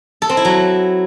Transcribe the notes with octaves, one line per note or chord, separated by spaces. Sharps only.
A4
C4
E4
F#3